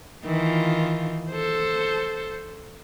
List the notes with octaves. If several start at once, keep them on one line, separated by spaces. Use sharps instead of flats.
D#3 E3 F4
A4 C5